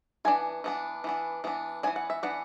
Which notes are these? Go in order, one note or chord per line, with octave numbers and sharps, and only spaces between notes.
E3 B3 D4 G#5
E3 B3 D4
E3 B3 D4
E3 B3 D4
E3 B3 D4 G#5
F#5
E5
E3 B3 D4 F#5